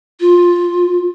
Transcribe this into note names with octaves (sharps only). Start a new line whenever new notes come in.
F4